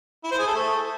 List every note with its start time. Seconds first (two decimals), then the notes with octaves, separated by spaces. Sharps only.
0.24 E4
0.31 C5
0.39 G#4
0.47 A4
0.54 A3